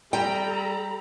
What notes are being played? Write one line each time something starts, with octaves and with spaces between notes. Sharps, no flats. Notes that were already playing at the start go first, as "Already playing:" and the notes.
G3 A4 G5 A#5 B5